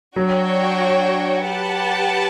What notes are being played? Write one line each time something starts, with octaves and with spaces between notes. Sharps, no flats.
F#3 D4 F#4 C#5 G5
G4 B4 F#5 A5